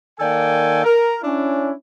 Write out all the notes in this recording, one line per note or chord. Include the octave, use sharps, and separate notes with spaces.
D#3 A#3 A4 D5 G5 G#5
A#4
C#4 D4 E4